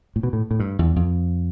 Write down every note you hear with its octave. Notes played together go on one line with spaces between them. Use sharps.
A2
B2
A2
A2
G2
E2
F2